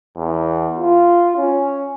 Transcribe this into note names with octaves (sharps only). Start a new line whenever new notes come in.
E2
F4
C#4